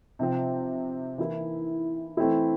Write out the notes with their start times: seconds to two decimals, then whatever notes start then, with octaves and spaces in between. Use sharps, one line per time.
0.19 C3 F3 C4
1.18 E3 A#3 E4
2.17 E3 A3 C4 E4